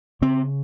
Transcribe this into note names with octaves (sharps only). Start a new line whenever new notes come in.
C#3 C4